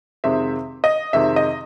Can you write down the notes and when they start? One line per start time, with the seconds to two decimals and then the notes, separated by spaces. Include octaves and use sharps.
0.24 F2 C3 D#3 G#3 C4 E5
0.84 D#5
1.13 F2 C3 D#3 G#3 C4 E5
1.36 D#5